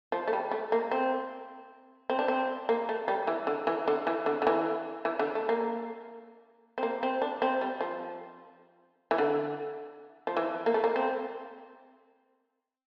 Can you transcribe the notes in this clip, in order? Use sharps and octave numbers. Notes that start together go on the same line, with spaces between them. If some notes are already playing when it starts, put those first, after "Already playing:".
F3
A3
G3
A3
A#3
C4
C4
D4
C4
A#3
A3
G3
E3
D3
E3
D3
E3
D3
D3
E3
E3
D3
A3
A#3
C4
A#3
C4
D4
C4
G3
F3
E3
D3
F3
E3
A#3
A3
A#3
C4